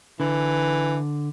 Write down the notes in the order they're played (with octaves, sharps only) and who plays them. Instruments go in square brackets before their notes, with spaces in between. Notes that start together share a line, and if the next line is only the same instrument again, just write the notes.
[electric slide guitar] D3 [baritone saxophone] E3